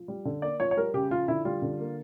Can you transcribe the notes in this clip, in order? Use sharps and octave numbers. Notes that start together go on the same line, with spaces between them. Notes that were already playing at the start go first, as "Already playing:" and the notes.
Already playing: F3
G3
D3
A#3 D5
F3 C#5
C#5
G3 A#4
C#3 G4
F3 F4
D3 E4
G3 F4
D3
A#3